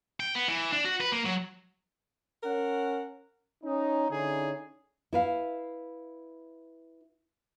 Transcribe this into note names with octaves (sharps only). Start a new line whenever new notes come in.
G5
B3
E3
D4
F#4
B4
A#3
F#3
C#4 A#4 F#5
C#4 D#4
D3 C#4 D#4 E4 G#4
E4 B4 F5